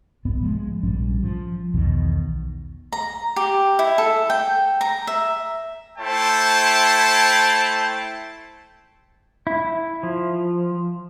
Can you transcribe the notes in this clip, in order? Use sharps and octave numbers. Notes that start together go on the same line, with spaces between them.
D#1 B1 G#2 B3
F3 G#3
A#1 G#2 G3 C#4
F3
B1 E2 B2 D#3
A#5
G4
E4
A4
G5
A#5
E5
A3 E4 C5 G5 A5
E4
F3